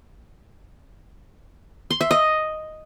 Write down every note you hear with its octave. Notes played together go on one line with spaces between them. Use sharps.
C6
E5
D#5